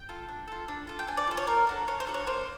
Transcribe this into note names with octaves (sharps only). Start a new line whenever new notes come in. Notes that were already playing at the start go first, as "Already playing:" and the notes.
Already playing: G5
F4 A4
D4
F4 A4
D4
F4 A4
G5
D4 G#5
D5
F4 A4
C#5
A#3 A#4
D4 F#4 A4
A#3 C#5
C5
D4 F#4 A4
C#5
A#3 C5